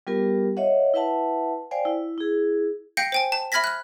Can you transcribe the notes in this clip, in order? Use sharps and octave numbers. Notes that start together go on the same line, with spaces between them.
G3 B3 F4 G4 A#4
C#5 D#5 E5 F#5
E4 B4 E5 F#5 A5
C5 D5 F5 G5 G#5
E4
E4 G#4
F5 G5 G6 A#6 C#7
C5 G5 G#5
A5
E5 B5 F6 G#6 A#6 B6
F6 F#6